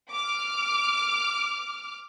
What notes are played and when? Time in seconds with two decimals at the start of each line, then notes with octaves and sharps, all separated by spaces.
0.10 D6 F6